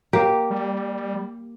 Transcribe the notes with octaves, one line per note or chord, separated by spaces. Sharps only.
A#3 G4 A#4
G3